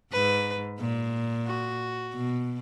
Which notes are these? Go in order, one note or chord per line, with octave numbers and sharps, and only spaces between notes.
G#2 B4
A#2
F#4
B2